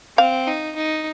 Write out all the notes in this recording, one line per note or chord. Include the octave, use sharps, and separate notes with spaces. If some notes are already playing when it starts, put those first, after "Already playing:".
C4 F5
D#4
D#4